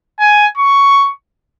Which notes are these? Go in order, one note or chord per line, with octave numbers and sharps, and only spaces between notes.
G#5
C#6